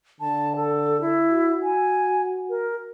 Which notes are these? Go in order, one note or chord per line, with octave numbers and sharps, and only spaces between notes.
D3 A5
A4
E4
F#4
G#5
A#4